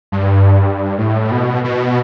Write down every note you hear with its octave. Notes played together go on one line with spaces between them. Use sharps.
G2
A2
B2
B2